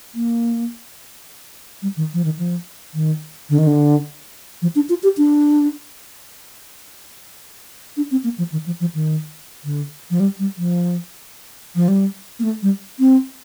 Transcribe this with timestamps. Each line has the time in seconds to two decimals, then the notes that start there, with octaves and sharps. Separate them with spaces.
0.15 A#3
1.82 G3
1.96 D#3
2.13 F3
2.24 D#3
2.38 F3
2.94 D#3
3.49 D3
3.58 D#3
3.67 D3
4.62 F3
4.75 D4
4.89 F4
5.03 G4
5.17 D4
7.97 D4
8.11 C4
8.24 A#3
8.38 F3
8.52 D#3
8.66 F3
8.80 F3
8.95 D#3
9.64 D3
10.10 F3
10.20 G3
10.39 G3
10.57 F3
11.75 F3
11.88 G3
12.39 A#3
12.43 A3
12.62 G3
12.99 C4